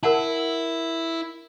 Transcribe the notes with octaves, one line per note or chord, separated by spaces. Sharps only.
E4 A#4 F#5 A5